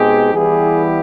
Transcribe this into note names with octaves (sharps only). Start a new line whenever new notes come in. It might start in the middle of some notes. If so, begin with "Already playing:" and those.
Already playing: B2 G#3 C4 D#4 G4 G#4
E3 G3 B3 E4 G4 G#4